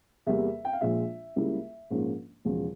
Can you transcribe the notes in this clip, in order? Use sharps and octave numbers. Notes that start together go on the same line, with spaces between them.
E2 C3 G3 A#3 E5
G5
F5
A#1 A#2 F3 G#3 E5
C#2 C#3 G3 A#3 E4
A#1 G#2 F3 A#3 C#4
E1 E2 C#3 F3